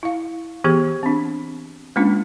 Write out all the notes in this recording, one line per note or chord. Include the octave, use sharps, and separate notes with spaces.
E4 F5
E3 B3 G4 G#4
C4 D4
G#3 A#3 C#4 D4 F4